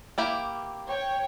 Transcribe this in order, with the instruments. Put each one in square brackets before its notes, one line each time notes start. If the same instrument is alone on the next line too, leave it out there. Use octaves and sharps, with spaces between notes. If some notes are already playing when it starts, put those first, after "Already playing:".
[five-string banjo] A#3 E4 G4
[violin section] C#5 G5